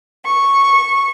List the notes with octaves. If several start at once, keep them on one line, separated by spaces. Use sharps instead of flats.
C#6